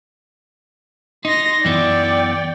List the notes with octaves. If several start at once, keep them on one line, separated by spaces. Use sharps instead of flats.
D#4 C6 A#6
F#2 E3 B3 D5 G5